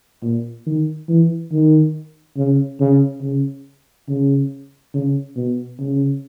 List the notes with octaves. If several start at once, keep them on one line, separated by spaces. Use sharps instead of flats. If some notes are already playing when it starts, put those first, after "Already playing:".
A#2
D#3
E3
D#3
C#3
C#3
C#3
C#3
C#3
B2
C#3